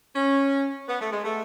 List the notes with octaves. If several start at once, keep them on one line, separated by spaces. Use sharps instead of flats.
C#4
B3
A3
G#3
A3